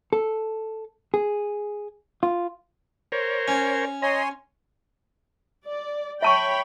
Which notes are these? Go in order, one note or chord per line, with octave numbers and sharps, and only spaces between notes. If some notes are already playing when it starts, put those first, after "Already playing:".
A4
G#4
F4
A#4 C5 C#5
C#4
C#5 D#5 G#5 A#5 C6
D5
C#5 E5 G5 A5 B5 C#6